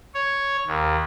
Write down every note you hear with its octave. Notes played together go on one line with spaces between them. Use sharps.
C#5
D#2